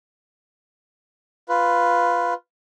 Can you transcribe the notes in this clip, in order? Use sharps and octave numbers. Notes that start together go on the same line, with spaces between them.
F4 B4